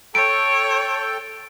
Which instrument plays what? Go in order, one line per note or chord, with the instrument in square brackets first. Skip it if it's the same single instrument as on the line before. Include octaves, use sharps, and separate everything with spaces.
[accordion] A4 G5 [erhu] C#5 [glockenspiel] D7